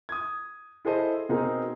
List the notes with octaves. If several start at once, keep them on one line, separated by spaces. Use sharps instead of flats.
D#6 G#6
E4 G#4 A4 C5 D#5
B2 C4 D#4 G#4 A#4